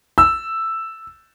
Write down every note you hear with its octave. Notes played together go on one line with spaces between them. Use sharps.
E6